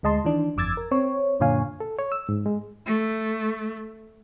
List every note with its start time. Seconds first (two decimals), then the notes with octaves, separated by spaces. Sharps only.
0.03 D2 G#3 D#5 A5 C6
0.24 D#3 E3 D4
0.56 G1 F2 D6 E6 G#6 A6
0.77 A#4
0.91 C4 C#5
1.40 F#2 A#2 D3 C#5 F5 G#5
1.80 A4
1.99 C#5
2.12 E6
2.29 G#2
2.46 G#3
2.86 A3